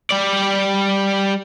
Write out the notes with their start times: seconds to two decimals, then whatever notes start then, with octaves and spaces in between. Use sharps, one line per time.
0.11 G3 D5